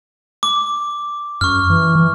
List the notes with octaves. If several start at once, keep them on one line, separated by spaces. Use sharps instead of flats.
D6
F#2 C#6 F6
E3
E3